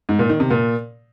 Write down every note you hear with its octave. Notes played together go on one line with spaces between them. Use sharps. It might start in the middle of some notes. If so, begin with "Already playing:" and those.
G#2
A#2
D#3
C3
A#2